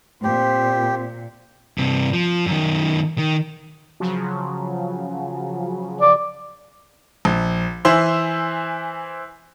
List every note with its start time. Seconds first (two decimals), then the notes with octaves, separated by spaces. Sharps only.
0.24 A#2 C4 G4 C5
1.78 G2 C3
2.13 F3
2.46 F#2 D#3
3.18 D#3
4.00 C#3 F3 F#3
6.01 D5
7.25 A#1
7.85 E3 E4 C5 G#5 C6 E6